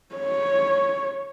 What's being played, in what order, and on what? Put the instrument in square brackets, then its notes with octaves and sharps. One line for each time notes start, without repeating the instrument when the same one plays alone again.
[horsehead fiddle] C#5